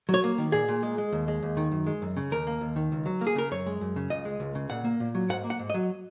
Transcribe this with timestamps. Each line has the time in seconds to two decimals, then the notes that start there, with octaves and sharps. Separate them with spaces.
0.09 F#3
0.14 C#5
0.24 A#3
0.38 D#3
0.52 A#2 G#4
0.68 A#2
0.83 G#3
0.98 G#3
1.12 D#2
1.28 G#3
1.43 D#2
1.57 D#3
1.72 F#2
1.87 G#3
2.02 F#2
2.17 C#3
2.31 D#2 A#4
2.47 A#3
2.61 D#2
2.76 D#3
2.92 C#2
3.06 F#3
3.21 A#3
3.27 G#4
3.35 C#3 A#4
3.51 F#2 C#5
3.66 G#3
3.81 F#2
3.96 C#3
4.10 C#2 D#5
4.25 G#3
4.40 C#2
4.55 C#3
4.70 A#2 F#5
4.84 A#3
5.00 A#2
5.15 F#3
5.29 G#2 F#5
5.44 A#3
5.50 F#5
5.59 G#2
5.70 D#5
5.74 F#3